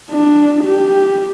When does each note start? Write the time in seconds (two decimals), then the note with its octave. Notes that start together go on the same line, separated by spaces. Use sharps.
0.11 D4
0.64 G4